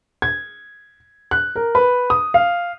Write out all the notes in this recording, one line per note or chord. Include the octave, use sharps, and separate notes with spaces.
G#6
F#6
A#4
B4
D#6
F5